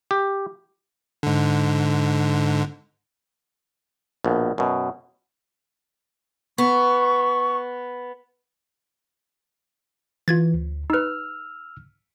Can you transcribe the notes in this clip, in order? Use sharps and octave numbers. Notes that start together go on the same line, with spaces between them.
G4
G#2 D3
A#1 B2
F#2 B2
B3 C#6
E3 F4 G#6 A6
D2
D#4 B4 E6 F6